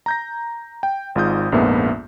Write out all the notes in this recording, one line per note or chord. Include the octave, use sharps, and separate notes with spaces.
A#5 G6 A#6
G5
G#1 G#2 F4 D#6 G6
A#1 F2 G#2 A#3 B3 E5